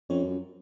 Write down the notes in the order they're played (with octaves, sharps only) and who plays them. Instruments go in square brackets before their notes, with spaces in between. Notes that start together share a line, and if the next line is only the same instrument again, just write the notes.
[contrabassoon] F2 [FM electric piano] C#4 C#5
[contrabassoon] F#2